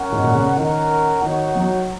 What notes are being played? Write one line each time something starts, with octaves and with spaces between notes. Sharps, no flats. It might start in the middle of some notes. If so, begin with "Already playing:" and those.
Already playing: C#4 A#4 F#5
G#2
A#2
C#3
D#3 C#4 A#4 F#5
D#3 D#4 F#4 C#5 F#5
F#3